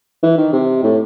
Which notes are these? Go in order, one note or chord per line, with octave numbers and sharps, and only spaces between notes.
E3
D#3
C3
A2